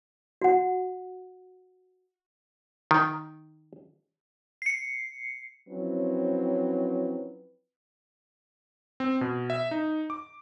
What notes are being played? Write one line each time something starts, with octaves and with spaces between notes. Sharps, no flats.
F#4 F#5
D#3
C7 C#7
F3 F#3 C4 C#4 E4 B4
C4
B2
E5
D#4
D6